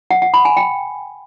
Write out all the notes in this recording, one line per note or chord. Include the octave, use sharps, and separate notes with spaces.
F#5
F#5
B5
G#5
G5